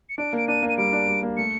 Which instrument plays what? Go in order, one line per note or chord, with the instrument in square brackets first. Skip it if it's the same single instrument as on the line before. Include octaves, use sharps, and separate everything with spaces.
[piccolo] C#7
[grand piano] D4 [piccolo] D7
[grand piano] A#3 [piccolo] D7
[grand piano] D4 [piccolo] D#7
[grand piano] A#3
[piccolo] D#7
[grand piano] G3 [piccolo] D7
[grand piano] D4
G3
A#3
[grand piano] A3 [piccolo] C#7